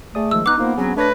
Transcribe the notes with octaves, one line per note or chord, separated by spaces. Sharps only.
A3 G#4 D5 D#6
D#3 F3 G#3 E6
B3 D#4 D6 F#6
A#3 B3 D#4 F4 C5
F#3 C4 C#4 G#4
A3 D4 B4 C#5 A#6